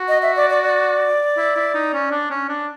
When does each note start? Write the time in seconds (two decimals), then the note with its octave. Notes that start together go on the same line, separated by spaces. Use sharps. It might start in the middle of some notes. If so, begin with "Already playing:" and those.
Already playing: F#4
0.08 D#5
0.22 E5
0.36 D5
0.50 D5
0.64 D5
1.37 E4
1.56 E4
1.75 D#4
1.93 C#4
2.11 D4
2.30 C#4
2.49 D4